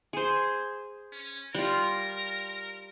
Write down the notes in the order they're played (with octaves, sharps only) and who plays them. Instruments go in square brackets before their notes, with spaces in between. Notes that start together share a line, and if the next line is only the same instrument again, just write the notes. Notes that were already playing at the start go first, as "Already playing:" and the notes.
[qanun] G#4 C5
[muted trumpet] C#4
[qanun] G3 F4 [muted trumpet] A#4